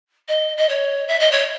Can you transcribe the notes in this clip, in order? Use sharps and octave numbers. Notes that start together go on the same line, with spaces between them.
D#5
D#5
C#5
E5
D#5
C#5